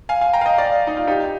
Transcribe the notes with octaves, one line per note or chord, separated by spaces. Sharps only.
F5 G#5
F5 G#5
G5 A#5
F5
D#5 G5
D5 F5
D#4
F4
D#4 G4